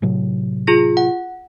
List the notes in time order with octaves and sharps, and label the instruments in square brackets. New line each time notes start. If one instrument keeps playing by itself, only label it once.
[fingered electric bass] A2 C3 F#3
[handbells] F4 G#4 A#6
F#5